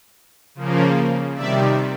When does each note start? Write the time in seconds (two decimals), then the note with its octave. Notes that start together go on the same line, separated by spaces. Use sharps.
0.55 C#3 F3 A#3
1.35 C3 D#3 G3 D5 E5